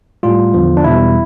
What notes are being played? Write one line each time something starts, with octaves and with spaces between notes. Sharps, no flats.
A2 G3 F4
E2 D3 F3
D4
E2 B2 G3 E4